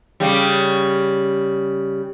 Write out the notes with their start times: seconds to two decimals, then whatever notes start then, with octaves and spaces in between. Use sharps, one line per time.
0.20 C#3 G3